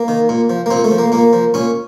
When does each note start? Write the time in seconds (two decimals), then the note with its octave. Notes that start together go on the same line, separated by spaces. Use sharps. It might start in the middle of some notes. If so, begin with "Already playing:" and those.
Already playing: A#3
0.08 D#3
0.29 A#2
0.50 F3
0.66 A#3
0.71 A#2 C4
0.84 A3
0.91 F3
0.98 A#3
1.12 A#2 A#3
1.33 F3
1.54 A#2 C#4